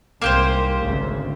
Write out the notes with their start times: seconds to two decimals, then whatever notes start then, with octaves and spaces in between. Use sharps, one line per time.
0.22 C2 G#2 A#3 G4 C5
0.80 G#1 D2 C#3